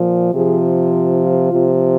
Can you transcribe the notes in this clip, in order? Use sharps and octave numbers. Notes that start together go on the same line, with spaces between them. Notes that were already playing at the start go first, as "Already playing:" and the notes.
Already playing: A#2 F3
C3 F3 G#4
F4
C3 F3